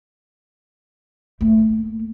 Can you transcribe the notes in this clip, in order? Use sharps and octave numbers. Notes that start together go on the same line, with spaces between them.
A3 A#3